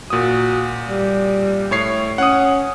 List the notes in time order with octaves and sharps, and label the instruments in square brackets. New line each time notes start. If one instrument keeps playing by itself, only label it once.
[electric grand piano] A#2 D#6 [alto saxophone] F#4
[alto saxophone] G3
[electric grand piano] A2 C#5 C7
[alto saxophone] C#4 [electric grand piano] F#5 D#6